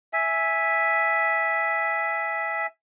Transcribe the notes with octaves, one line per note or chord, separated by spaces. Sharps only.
E5 G#5